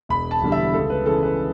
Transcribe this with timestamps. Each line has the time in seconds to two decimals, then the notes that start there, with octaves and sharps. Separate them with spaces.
0.09 E1 B5
0.31 A5
0.42 E2 D3 G3
0.52 E5
0.73 C#2 A4
0.90 B4
1.06 C#3 E3 A4
1.23 B4